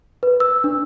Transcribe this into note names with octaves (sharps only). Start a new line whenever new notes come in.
B4
E6
D4